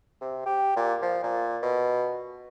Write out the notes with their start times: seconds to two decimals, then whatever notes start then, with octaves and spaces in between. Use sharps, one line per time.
0.21 C3
0.45 G4
0.76 A#2
1.02 F3
1.23 A#2
1.62 B2